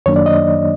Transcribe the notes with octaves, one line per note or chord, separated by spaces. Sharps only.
F#2 D#3 F#3 A#3 D4 C#5
D5
D#5